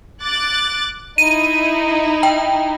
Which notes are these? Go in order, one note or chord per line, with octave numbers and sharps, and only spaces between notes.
D6 F#6 A6
D#4 E4 D#7
G5